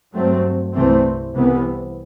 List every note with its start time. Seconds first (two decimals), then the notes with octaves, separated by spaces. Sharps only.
0.13 G2 F#3 A3 C4
0.73 C2 C3 E3 A3 C4
1.33 C2 C3 E3 B3